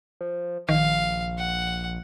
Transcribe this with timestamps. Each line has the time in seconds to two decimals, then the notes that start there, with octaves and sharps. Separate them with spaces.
0.21 F3
0.69 A#1 D#3 F5
1.38 F#5